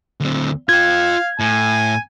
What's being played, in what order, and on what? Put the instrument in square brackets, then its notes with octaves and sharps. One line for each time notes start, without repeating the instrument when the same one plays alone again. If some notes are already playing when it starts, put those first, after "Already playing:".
[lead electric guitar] D2 C4
[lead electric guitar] F4 G5 [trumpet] F5 [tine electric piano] G#6
[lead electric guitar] A2 [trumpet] G#5